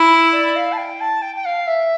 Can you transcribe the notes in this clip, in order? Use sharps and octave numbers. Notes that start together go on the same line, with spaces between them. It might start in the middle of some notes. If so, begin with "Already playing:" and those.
Already playing: E4
D5
F5
A5
G5
A5
G5
G5
F5
E5